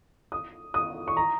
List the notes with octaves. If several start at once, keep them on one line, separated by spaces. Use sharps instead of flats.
D#6
D#6
C#6
A#5